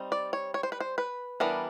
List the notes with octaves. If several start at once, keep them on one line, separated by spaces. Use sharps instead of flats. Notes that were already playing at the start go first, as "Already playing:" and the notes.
Already playing: G3 C4 D#4
D5
C#5
C#5
C5
B4
C5
B4
E3 G3 B3 D4 A#4